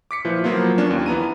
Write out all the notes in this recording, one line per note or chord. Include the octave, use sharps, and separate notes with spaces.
D6 B6 C#7
A#2 F3 E4 B4
F3 F#3 A#3 B3 F4
A#3 C#4 D4
D#2
E3 B3 A#5 D#7